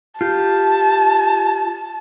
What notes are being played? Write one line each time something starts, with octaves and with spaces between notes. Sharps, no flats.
F4 G4 A5